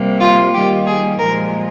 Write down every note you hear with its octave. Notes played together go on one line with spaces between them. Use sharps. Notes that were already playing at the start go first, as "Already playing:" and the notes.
Already playing: C3 G3 A#3
F4
D#3 G3 A#3 G4
G#4
A#2 F3 G#3 A#4